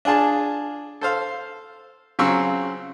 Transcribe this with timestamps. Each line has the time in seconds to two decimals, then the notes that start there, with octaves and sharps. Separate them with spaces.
0.05 D4 F4 G#4 A5
1.01 A4 C5 F5
2.19 C#3 F#3 C4 F4 C#6 E6